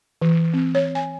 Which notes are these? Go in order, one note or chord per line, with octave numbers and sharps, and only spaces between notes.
E3
C4
C#5
G#5